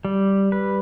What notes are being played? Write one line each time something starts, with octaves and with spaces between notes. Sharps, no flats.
G3
B4